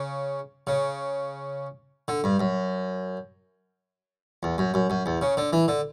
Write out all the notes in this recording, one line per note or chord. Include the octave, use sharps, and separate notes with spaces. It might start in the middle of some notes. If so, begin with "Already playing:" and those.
Already playing: C#3
C#3
D3
G2
F#2
E2
F#2
F#2
F#2
E2
C#3
D3
E3
D3